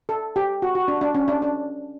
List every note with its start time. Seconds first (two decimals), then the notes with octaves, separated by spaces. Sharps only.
0.09 A4
0.36 G4
0.62 F#4
0.75 F#4
0.88 D4
1.01 D4
1.15 C#4
1.28 D4
1.42 D4